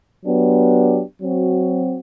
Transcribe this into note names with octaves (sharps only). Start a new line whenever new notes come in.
F#3 B3 D4 G4
F#3 C4 F#4